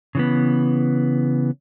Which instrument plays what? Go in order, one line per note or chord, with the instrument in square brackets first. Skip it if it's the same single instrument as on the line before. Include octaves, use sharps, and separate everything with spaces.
[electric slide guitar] C#3 E3 B3